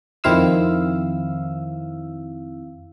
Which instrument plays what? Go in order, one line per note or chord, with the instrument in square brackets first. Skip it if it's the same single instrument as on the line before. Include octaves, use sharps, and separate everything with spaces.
[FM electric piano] F2 D#3 C4 E4 F5 E6